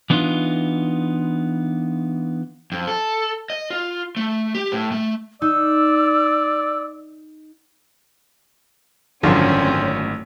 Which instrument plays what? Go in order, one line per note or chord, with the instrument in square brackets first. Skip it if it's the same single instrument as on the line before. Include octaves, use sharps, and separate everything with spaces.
[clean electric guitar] E3 B3 D4 D#4 F4
[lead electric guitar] F2
A4
D#5
F4
A3
G4
A2
A3
[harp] D#4 [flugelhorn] D5 [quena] E6
[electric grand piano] G#1 [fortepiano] F#2 D3 F3 [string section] A2 C#4 [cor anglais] C4